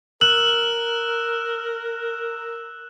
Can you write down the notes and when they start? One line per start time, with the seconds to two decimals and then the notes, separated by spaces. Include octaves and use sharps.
0.21 A#4 E6 F#6 E7 F#7